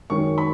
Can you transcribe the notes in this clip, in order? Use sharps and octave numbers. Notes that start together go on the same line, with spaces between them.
F#2 D#3 G#3 C#4 C#6
B5